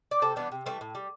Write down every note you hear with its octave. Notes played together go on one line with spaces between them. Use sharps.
D5
C3 A4 C5
E3 G3 B3 D4
C3
E3 G3 A3 C4
A2
G3